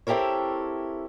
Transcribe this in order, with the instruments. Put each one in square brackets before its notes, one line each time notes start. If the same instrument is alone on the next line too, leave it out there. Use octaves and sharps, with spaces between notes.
[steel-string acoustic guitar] C4 E4 G4 A4 A#4 C#5